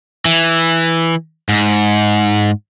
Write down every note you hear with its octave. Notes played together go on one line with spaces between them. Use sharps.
E3
G#2